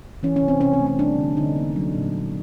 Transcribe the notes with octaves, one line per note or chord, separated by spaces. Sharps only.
E3 C#4
C#4
C3
C4
C3 C#4
C4
A3
C#4
G3 D4
D3
D3 D#4
A#3
F#3
A#2
A#2